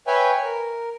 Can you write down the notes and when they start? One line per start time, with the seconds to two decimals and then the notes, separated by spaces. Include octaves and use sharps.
0.07 B4 C#5 E5 G5 G#5
0.43 A#4